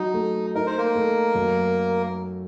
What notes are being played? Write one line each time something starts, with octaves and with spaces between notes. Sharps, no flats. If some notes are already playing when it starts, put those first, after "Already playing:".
Already playing: F#3 D#4
A3
D#4 A#4
C5
A#3 A#4
A3
F#2